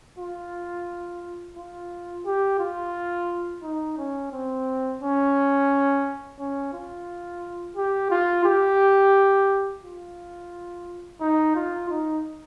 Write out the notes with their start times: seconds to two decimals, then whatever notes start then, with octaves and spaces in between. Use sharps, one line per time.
0.18 F4
1.56 F4
2.26 G4
2.60 F4
3.62 D#4
3.97 C#4
4.32 C4
5.01 C#4
6.39 C#4
6.73 F4
7.76 G4
8.11 F4
8.45 G4
9.83 F4
11.20 D#4
11.55 F4
11.90 D#4